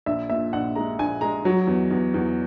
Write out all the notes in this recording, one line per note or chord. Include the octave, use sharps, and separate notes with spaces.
A#1 E5
A#2 E5
A#1 F#5
G#3 A#5
A#1 G#5
G#3 A#5
F#3
E2
E2
E2